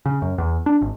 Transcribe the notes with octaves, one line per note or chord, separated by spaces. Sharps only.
C#3
F#2
E2
D4
G#1